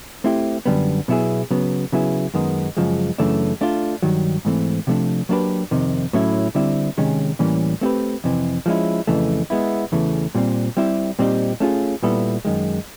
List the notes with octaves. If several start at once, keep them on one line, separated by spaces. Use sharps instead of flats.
A3 C4 E4 G4
F#2 D3 G3 B3
B2 F#3 B3 E4 G#4
C#3 F#3 B3
C#3 F#3 B3 E4 G#4
F#2 D#3 G#3 B3
F#2 C#3 F3 G#3
F#2 C#3 E3 A3 D4
A3 D4 F4
G2 D#3 F#3
G#2 E3 A3 C4
C3 F3 A3 D4
F#3 A#3 D4 G4 B4
F2 C3 D#3
A2 F#3 A3 C#4 E4
D3 G3 C4 E4
C3 D#3 G#3 C#4
A2 E3 G3 A#3 C#4
A3 C4 E4 G4 B4
F2 C3 E3
F3 G#3 C#4 E4
F2 C#3 E3 A3
G#3 B3 E4
E2 C#3 E3 A3
A#2 G3 C4
G3 C4 E4 G4
A#2 G3 C4 D#4 G4
A3 C#4 F4 G#4
A#2 G3 B3 E4 A4
F#2 D#3 G#3